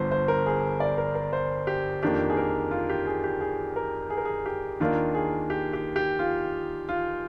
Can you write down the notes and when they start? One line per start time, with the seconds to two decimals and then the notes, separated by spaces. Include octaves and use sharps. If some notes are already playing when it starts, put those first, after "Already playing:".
Already playing: G1 G2 F3 C5
0.11 C5
0.28 A#4
0.46 G#4
0.80 D5
0.98 A#4
1.15 A#4
1.33 C5
1.67 G4
2.03 F2 D#3 A#3 D4 G4
2.30 G#4
2.37 A#4
2.71 F4
2.89 G4
3.07 G#4
3.24 G4
3.41 G#4
3.76 A#4
4.10 G#4
4.17 A#4
4.25 G#4
4.46 G4
4.80 D#2 D#3 A#3 D4 F4
5.15 G#4
5.50 G4
5.73 G4
5.96 G4
6.19 F4
6.89 F4